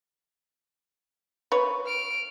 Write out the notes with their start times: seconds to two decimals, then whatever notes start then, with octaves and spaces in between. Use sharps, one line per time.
1.52 B4 C#5
1.86 F6 D7